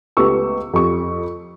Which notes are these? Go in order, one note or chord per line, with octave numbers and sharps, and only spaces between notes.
C#2 A3 B3 G4 C#6 E6
F2 G4 C#6